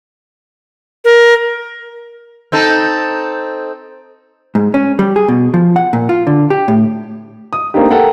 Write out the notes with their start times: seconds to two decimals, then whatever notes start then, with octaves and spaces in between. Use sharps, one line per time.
1.05 A#4
2.52 C4 D#4 A4
4.55 G#2
4.74 C#4
4.99 G3
5.16 G#4
5.28 B2
5.54 F3
5.76 F#5
5.93 A#2
6.09 F4
6.27 D3
6.50 G4
6.68 A2
7.53 D#6
7.74 A3 A#3 C4 D4 D#4 G4
7.90 A4 A#4 F#5 G5